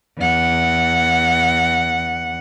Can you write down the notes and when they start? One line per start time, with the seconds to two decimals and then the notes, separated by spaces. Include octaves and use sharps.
0.18 E2 F#5